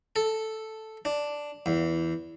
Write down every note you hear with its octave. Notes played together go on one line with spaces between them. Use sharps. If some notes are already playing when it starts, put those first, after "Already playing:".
A4
D4
E2